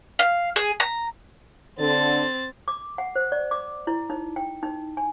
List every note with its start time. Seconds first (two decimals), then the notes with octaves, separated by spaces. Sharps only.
0.19 F5
0.56 G#4
0.80 A#5
1.79 D3 C4 A6
2.68 D6
2.98 F#5
3.16 C5
3.32 D5
3.51 D6
3.87 E4
4.10 D#4
4.36 G5
4.63 D#4
4.97 G#5